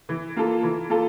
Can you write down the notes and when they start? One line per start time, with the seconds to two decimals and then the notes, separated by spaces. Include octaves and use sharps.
0.09 E3
0.36 A#3 F4 A4
0.63 E3
0.89 A#3 F4 A4